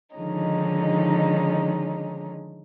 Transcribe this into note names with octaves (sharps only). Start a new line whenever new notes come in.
D3 D#3 F3 G#3 C#4 D#4